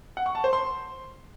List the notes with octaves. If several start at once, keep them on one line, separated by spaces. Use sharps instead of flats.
F#5
C#6
A5
C5
C6